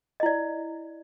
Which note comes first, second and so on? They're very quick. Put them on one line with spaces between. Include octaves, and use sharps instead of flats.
D#5 E4 D5